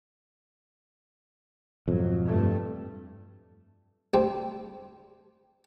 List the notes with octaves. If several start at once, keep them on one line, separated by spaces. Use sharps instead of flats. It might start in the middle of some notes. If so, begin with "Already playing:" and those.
F2 G#2 B2 F#3
G2 G3 A3
D2 G3 C4 A4 G5